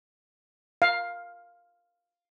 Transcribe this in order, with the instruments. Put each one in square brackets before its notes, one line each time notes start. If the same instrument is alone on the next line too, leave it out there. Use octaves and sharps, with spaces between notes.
[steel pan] F5